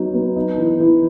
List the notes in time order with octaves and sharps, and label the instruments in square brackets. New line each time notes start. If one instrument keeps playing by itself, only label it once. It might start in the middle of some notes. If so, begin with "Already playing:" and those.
Already playing: [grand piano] F#3 B3 D#4
B3
D#4
E3
E3